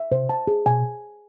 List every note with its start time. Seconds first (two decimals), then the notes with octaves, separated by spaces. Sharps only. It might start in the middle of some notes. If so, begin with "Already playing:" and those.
Already playing: E5
0.11 C3 C5
0.29 A5
0.47 G#4
0.66 B2 G#5